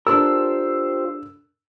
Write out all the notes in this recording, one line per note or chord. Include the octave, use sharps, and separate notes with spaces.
D4 F4 G4 A4 A#4 C5 E6